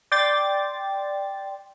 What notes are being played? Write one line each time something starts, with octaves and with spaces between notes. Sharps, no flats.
D5 G5 C6 A6